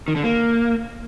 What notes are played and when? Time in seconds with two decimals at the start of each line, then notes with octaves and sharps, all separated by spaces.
0.08 D#3
0.16 D3
0.24 A#3